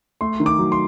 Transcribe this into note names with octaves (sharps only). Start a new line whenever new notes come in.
A3 C6
D#3
D6
F#3
C6